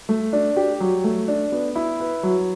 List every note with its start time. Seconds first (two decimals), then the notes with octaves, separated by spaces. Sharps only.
0.09 A3
0.33 D4
0.56 G4
0.80 F#3
1.04 A3
1.28 D4
1.52 B3
1.76 E4
2.00 B4
2.23 F#3